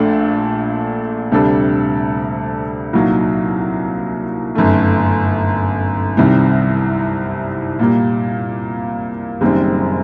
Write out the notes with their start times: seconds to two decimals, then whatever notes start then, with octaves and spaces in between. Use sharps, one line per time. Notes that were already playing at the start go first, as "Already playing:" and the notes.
Already playing: A#1 A#2 A3 D4 A4
1.32 D2 C3 G3 D4 A4
2.93 C2 A#2 F#3 A#3 D#4
4.55 G1 F#2 D#3 A3
6.17 C2 C3 D#3 G3
7.79 A#2 G3 A#3
9.41 F#1 F#2 D#3 G3 C4